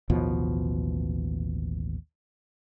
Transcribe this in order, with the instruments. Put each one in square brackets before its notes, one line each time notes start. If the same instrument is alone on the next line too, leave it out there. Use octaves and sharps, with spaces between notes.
[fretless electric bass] A1 D#2 B2 F3